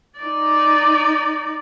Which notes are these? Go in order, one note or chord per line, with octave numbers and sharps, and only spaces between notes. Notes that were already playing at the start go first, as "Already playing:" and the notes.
D#4 D5